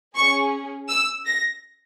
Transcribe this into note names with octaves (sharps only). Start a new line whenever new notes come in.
C#4 G#4 C#6
E6
A#6